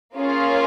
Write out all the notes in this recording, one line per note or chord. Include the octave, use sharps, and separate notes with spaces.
A#3 C#4 F4 G#4